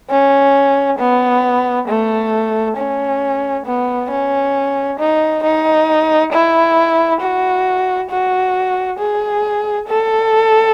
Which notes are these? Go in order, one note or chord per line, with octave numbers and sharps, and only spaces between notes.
C#4
B3
A3
C#4
B3
C#4
D#4
D#4
E4
F#4
F#4
G#4
A4